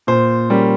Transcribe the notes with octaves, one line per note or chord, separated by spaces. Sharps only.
A#2 C5
G3 A#3 C#4